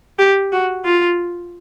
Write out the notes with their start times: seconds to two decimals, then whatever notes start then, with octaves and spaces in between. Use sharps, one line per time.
0.19 G4
0.52 F#4
0.85 F4